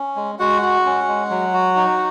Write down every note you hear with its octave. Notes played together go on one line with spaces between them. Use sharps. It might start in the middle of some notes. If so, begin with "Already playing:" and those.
Already playing: C#4
G#3
G#3 F#4 F#5
F#4
C#4
G#3
F#3
F#4
D#4